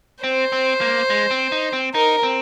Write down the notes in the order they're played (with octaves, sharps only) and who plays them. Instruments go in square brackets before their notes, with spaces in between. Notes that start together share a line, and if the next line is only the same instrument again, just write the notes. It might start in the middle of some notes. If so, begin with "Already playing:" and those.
[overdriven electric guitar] C4 [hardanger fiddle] C5
[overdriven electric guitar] C4
A#3
G#3
C4
D#4
C4
[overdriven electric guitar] D#4 [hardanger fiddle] A#4
[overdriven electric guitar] C4